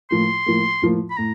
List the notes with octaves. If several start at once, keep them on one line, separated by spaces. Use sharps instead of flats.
A2 F3 A#3 C6
A2 F3 A#3
A2 F3 A#3
B5
A2 A#5